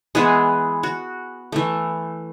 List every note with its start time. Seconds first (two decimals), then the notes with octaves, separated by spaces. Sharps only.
0.15 E3 G#3 B3 G#4
0.83 F#4
1.52 E3 A3